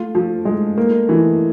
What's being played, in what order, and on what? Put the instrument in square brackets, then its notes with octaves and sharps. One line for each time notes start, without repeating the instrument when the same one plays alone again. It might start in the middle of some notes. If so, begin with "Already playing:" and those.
Already playing: [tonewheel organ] A3 [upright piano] F4
[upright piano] F3
G#3
A#3
E3